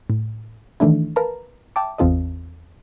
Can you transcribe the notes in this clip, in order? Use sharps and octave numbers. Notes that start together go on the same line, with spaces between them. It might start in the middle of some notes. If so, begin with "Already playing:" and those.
A2
D#3 E3 A3 D4 E4
A#4 B4 F5 A5 A#5
E5 G5 A5 D6
G#1 E2 C4 F4 A4 D#5